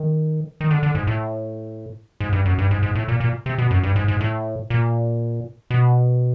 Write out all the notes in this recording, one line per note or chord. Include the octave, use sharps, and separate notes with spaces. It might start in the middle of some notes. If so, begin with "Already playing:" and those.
Already playing: D#3
D#3
D3
D3
G#2
A2
G#2
G2
F#2
G2
G#2
G#2
A2
A#2
A#2
C3
B2
F#2
G2
G#2
G#2
A2
A#2
B2